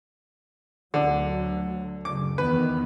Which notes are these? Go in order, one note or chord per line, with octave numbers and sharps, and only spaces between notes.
D2 D3 F#3
F#2 C#3 D6
E2 D#3 B3 B4